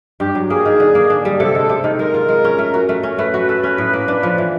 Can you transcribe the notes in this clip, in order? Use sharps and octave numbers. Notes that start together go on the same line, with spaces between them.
G2 G4
F#3
A#3 G#4
D#3
D3
A#3
D4
G3
C3 A4
G#3
C3
D#3
G#3 A#4
F4
G#3
C#4
A3
F#4
A3
C#4
A3 B4
F#4
A4
C#4
A2
A#3
D4
F3
E3